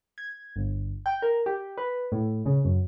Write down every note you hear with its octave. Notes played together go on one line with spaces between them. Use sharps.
G#6
G1
G5
A#4
G4
B4
A2
C#3
F#2